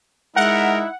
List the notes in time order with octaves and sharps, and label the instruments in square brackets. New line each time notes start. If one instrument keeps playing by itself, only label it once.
[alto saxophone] G#3 [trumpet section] D#4 E4 E5 [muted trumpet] A#4 [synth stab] F#5